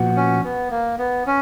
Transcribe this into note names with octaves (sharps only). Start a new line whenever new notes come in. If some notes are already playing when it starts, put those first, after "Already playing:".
Already playing: A#2 F3 B3 F#4
C#4
B3
A#3
B3
C#4